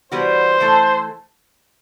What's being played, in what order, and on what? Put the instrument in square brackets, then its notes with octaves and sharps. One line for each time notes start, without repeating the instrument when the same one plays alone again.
[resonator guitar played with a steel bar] E3 G3 B3 F#4 [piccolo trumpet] C5
[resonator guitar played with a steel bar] E3 A3 E4 A4